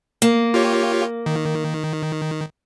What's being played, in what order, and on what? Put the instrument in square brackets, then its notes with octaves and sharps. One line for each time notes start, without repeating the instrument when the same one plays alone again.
[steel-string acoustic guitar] A#3
[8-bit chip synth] F4 G4 C#5
D#3